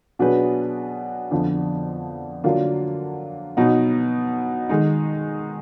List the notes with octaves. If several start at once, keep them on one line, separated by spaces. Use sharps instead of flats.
B2 F#3 D4 G#4 B4
F2 D3 F3 B3 D4
D3 F#3 A#3 D4 F4
B2 F#3 B3 D#4
D#3 G#3 D#4